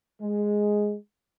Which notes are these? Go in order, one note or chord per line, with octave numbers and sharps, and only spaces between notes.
G#3